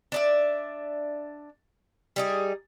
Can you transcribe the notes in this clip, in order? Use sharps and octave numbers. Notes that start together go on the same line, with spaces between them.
D4 D5 E5
G3 D#4 G#4